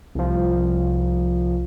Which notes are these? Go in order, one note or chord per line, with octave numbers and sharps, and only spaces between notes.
C2 F3